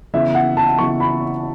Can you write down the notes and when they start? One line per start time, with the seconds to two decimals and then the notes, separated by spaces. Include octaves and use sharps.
0.14 C#3 E3 B3 E5
0.35 F#5
0.57 A5
0.78 C#3 E3 B3 C#6
1.00 B5